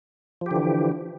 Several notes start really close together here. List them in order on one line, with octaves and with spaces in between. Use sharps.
F3 G4 D3 E3